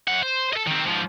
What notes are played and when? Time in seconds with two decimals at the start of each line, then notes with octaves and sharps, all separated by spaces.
0.08 F#2 F#5
0.23 C5
0.53 A4 D#5
0.67 D#3 C4
0.86 G#2 F3